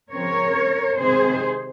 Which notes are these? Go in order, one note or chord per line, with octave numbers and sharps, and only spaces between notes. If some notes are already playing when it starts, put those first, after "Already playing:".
C#3 F3 C4 A#4 C#5
C3 D#3 G#3 C4 G#4 C5